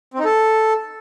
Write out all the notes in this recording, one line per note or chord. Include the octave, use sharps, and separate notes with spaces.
C4
D#4
A4